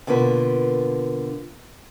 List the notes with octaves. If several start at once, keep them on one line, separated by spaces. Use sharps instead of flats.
B2 D3 A#3 F4 B4